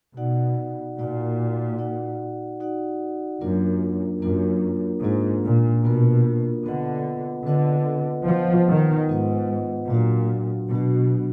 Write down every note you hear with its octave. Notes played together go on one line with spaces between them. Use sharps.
B2 D#4 F#4 D5 F#5
A#2 D#4 F#4 D5 F#5
D#4 F#4 D5 F#5
D#4 F#4 D5 F#5
F#2 A#3 D4 F4 A#4
F#2 A#3 D4 F4 A#4
G#2 A#3 D4 F4 A#4
A#2
B2 A#3 D4 F4 A#4
D3 B3 F4 B4 D#5 F#5
D3 B3 F4 B4 D#5 F#5
F3 B3 F4 B4 D#5 F#5
D#3
G#2 B3 F4 B4 D#5 F#5
A#2 F#3 D4 F#4
B2 F#3 D4 F#4